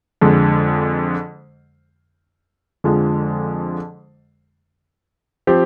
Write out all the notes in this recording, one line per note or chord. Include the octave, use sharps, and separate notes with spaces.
F2 D3 G#3
F2 D3 F3 G#3
F3 C4 G4